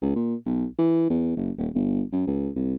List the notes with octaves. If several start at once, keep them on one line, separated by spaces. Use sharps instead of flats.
C#2
A#2
B1
E3
E2
F#1
D#1
G1
F#2
C#2
C2